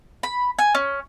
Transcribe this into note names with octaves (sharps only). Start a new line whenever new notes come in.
B5
G#5
C#4